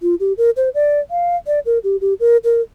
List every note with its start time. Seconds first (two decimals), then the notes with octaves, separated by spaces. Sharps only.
0.02 F4
0.20 G4
0.38 A#4
0.57 C5
0.75 D5
1.11 F5
1.47 D5
1.66 A#4
1.84 G4
2.01 G4
2.20 A#4
2.44 A#4